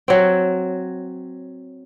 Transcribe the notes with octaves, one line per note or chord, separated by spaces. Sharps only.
F#3 C4